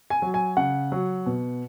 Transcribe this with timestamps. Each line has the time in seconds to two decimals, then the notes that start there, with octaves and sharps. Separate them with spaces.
0.10 G#5
0.22 F#3
0.34 G#5
0.57 C#3 F#5
0.92 F#3
1.26 B2